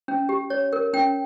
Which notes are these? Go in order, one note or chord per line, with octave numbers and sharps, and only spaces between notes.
C#4
G4
C#5
A#4
C#4 G5